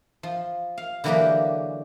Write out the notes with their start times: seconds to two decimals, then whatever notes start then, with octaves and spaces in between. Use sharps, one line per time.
0.23 F3
0.78 F5
1.04 D3 E3 F#3 A#3 G4 G#4